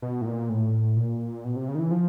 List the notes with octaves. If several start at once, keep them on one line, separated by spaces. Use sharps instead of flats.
B2
A2
A#2
A2
A#2
B2
C3
C#3
D#3
E3
F3